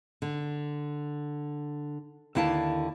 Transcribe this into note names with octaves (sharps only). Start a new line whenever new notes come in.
D3
D#2 D3 E4 F5 A5